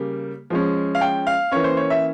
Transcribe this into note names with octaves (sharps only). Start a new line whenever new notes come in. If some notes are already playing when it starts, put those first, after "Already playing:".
Already playing: C#3 G3 A#3
F3 G#3 C#4
F5
G5
F5
E3 A#3 C#4 C#5
C5
C#5
E5